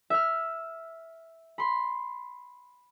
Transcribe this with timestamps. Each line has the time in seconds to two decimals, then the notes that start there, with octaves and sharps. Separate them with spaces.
0.10 E5 F6
1.58 B5 C6